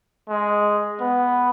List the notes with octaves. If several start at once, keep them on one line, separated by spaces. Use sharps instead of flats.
G#3
B3